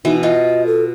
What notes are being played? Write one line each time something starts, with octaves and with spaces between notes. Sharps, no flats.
B2 E3 D#4
F4 F#4 D#5
A4